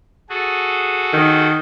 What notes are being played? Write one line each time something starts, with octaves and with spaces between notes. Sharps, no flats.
F#4 G#4 A4
D#3